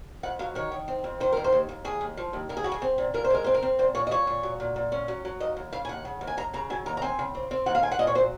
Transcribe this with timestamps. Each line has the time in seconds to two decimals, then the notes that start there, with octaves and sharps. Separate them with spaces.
0.23 F2 F#5
0.39 F#3 F5
0.55 D#3 C#5
0.72 D#3
0.88 C4
1.04 F2
1.20 D#3 C5
1.32 F2 A#4
1.44 C5
1.53 D#2
1.69 D#2
1.85 D#2 G#4
2.01 D#2
2.17 F3
2.33 D#2
2.49 D#2 A#4
2.57 G#4
2.64 C#3 F#4
2.72 G#4
2.82 C4
2.98 A#2
3.14 A#2 A#4
3.24 C5
3.30 G#3 A#4
3.44 C4 C5
3.54 A#4
3.62 C4
3.79 A#2 C5
3.95 A#2 C#5
4.07 D#5
4.11 A#2 C#5
4.27 A#2
4.43 F#3
4.60 A#2
4.76 A#2
4.92 C#4
5.08 F#3
5.25 F#3
5.40 D#2 D#5
5.57 D#2
5.73 C#3 F5
5.85 G#5
5.89 D#2 F#5
6.05 C#3
6.21 D#2
6.27 G#5
6.37 D#2 A#5
6.54 C#3 A#5
6.70 F#3 G#5
6.86 D#2 A#5
6.97 A#5
7.02 C4 G#5
7.19 C#3
7.35 C4
7.51 C4
7.66 D#2 F#5
7.75 F5
7.83 C4 G#5
7.92 F#5
7.99 A#2 D#5
8.07 C#5
8.15 F#3 C5